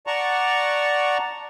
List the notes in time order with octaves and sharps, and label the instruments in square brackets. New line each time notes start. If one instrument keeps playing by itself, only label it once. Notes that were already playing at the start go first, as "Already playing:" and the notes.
[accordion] D5 F#5 A5 A#5 C#6